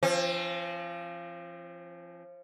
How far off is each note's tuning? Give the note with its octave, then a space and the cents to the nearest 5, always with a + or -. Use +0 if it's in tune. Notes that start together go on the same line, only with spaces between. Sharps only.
F3 -25 C4 +35